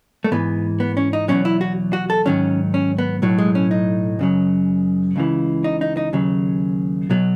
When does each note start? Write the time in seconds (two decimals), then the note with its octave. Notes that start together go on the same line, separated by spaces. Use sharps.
0.24 A3
0.32 G#2 E3 B3
0.80 B3
0.97 C#4
1.13 D#4
1.28 E2 B2 F#3 C#4
1.45 E4
1.61 F#4
1.93 F#4
2.10 A4
2.26 G#2 D#3 F#3 C#4
2.74 C#4
2.98 B3
3.22 B1 A2 F#3
3.38 G#3
3.55 C#4
3.71 D#4
4.19 F#2 C#3 F#3
5.16 C#2 C#3 E3
5.64 D#4
5.81 D#4
5.97 D#4
6.13 D#2 C#3 F#3
7.10 B1 B2 F#3